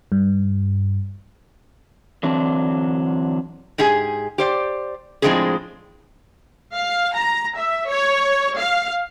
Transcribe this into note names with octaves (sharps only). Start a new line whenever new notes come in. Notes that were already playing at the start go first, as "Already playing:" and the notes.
G2
D3 E3 F#3 C4 D4
G#2 G4 G#4 G#5
G4 C5 D5
A2 F3 G#3 C4 D4 G#4
F5
A#5
E5
C#5
F5